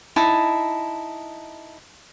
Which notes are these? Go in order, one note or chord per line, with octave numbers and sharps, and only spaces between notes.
D#4 E4 A5